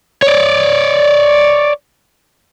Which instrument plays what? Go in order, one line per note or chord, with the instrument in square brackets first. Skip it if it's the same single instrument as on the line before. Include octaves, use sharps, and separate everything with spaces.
[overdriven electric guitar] C#5 D5